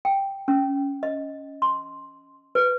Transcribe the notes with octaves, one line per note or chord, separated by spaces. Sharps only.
G5
C#4
D#5
C6
B4